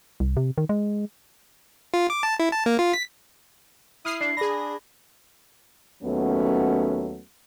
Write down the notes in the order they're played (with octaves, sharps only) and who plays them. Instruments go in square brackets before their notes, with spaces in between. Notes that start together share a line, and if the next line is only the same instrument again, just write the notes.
[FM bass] C2
C3
D#3
G#3
[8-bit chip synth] F4
D6
A5
E4
A5
A#3
F4
B6
[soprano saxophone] E4 [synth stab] D#6 F6 C7 [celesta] D#7
[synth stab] D4 [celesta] C7
[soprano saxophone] D4 [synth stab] G#4 A#6 [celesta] B5
[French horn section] D#2 F#3 A3 B3 C#4